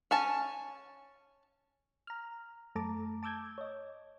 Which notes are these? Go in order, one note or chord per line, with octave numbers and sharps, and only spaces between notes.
C#4 G#5 A5
A#5 F6
F#2 A3 A5 A#5 D6
A5 D6 E6 G6 G#6
C#5 D#5